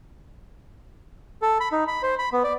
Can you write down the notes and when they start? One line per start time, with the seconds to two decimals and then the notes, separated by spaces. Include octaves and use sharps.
1.42 A4
1.60 B5
1.72 D#4
1.88 B5
2.03 C5
2.19 B5
2.33 B3
2.44 D5